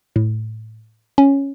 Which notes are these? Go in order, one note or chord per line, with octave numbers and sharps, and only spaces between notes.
A2
C#4